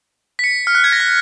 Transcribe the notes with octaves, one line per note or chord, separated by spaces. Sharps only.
B6
C#7
F6
F#6
G#6
A#6
B6